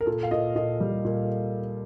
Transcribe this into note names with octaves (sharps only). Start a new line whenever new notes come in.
A#4
A#2 A4
F5
A#2 D#5
A#2 D#5
G3
A#2